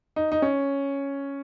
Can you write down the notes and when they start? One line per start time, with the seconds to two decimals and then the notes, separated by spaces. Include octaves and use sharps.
0.16 D#4
0.32 D#4
0.42 C#4